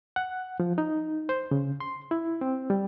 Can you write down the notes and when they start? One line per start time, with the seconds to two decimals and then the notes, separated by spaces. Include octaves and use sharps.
0.16 F#5
0.60 F3
0.78 D#4
1.29 C5
1.51 C#3
1.80 C6
2.11 E4
2.41 C4
2.70 G3